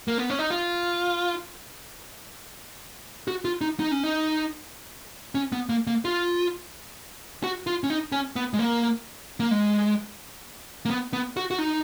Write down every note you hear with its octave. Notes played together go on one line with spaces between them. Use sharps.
A#3
B3
C#4
D#4
F4
F#4
F4
D#4
D#4
C#4
D#4
C#4
B3
A#3
A#3
F4
F#4
F4
C#4
D#4
C#4
B3
G#3
A#3
A#3
G#3
A#3
B3
B3
F#4
F#4
D#4